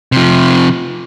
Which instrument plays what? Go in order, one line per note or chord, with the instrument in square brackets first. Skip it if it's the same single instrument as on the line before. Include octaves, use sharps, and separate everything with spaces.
[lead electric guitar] C3 F3